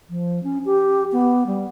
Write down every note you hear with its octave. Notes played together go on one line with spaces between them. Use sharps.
F3
C#4
G4
B3
G3